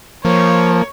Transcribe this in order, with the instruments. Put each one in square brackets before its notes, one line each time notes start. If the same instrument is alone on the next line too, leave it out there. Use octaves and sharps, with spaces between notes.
[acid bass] F3 [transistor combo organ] A#3 [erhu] C#5